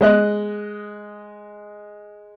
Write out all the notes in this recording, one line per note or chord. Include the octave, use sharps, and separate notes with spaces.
G#3 D#5 F#6